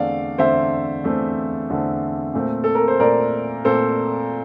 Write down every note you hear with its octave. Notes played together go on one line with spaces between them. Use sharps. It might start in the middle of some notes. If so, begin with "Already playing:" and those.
Already playing: E2 D3 A3 C4 D5 F5
E2 D3 A3 C4 C5 E5
E2 D3 A3 C4
E2 D3 A3 C4
A#2 A3 C4
A4
A#4
C5
A#2 A3 C4 A#4 D5
A#2 A3 C4 A4 C5